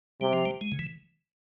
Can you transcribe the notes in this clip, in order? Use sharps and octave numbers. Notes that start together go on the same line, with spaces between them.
C3 G3
F3
G3
G#3
C#3
E3